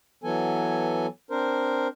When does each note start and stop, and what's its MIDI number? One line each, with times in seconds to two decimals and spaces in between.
0.23 1.07 52
0.23 1.07 54
0.23 1.07 59
0.23 1.07 69
0.23 1.07 80
1.31 1.87 60
1.31 1.87 62
1.31 1.87 70
1.31 1.87 72